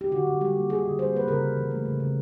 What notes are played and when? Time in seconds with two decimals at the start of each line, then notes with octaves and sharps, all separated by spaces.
0.01 G4
0.11 D3 F#4
0.27 D3
0.41 G3 G4
0.56 A#3
0.70 D3 G#4
0.85 D3
0.99 G3 C5
1.13 A#3 B4
1.27 C#3 A#4
1.42 C#3
1.57 E3
1.71 A3
1.85 C#3
2.00 C#3